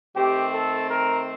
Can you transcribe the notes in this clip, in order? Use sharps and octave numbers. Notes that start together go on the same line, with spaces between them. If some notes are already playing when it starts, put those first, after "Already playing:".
D#3 A3 C4 G4
A4
A#4